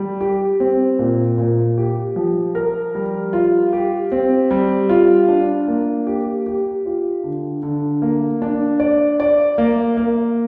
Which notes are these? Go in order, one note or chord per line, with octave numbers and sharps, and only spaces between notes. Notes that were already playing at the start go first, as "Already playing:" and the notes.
Already playing: G3
G4
C4
A#2
A#2
G4
F3
A#4
G3
F4
G4
C4
G3
F4
D4
A#3
G4
G4
F4
D3
D3
A#3
D4
D5
D5
A#3
A#3